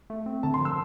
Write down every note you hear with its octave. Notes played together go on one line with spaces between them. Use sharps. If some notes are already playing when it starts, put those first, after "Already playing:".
A3
C4
D3 A5
C6
F3
E6